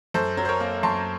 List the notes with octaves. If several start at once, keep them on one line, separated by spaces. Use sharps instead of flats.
F#2 A4 C5
F#3
C5
A#4 C#5
A#3
F#2 A5 C6